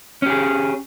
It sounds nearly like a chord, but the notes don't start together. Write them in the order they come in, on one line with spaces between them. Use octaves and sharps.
C#4 G4 G#4